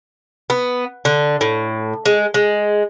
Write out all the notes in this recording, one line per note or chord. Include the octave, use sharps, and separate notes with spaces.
B3
D3
A2
G#3
G#3